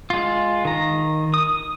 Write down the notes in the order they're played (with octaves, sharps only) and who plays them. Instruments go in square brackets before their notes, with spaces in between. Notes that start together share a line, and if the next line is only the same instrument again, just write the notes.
[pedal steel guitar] G#3 F4
D#3 A#5
D#6